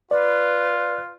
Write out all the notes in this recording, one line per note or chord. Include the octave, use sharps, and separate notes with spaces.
F4 B4 D5